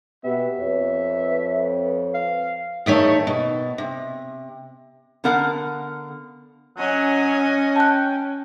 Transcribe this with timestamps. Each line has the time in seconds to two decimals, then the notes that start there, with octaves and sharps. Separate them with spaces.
0.24 B2 B3 G4 E5
0.58 F2 B4 C#5
2.14 F5
2.86 E2 D#3 A3 C#5
3.27 B2
3.78 C3
5.24 D3 B3 A#4 F5 F#5
6.78 F#3 C#4 D#5 G#5
7.76 G5 A5 F#6